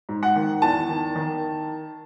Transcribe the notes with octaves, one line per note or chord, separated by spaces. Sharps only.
G#2
F#5
D#3
E2 A5
D#3
D#3